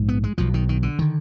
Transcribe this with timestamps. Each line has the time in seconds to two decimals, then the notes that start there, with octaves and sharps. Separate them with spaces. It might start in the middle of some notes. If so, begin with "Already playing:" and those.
Already playing: A#1 G#2
0.08 B3
0.24 G#3
0.38 B1 B2 F3
0.54 D#3
0.69 D#3
0.83 D3
0.99 D3 D#3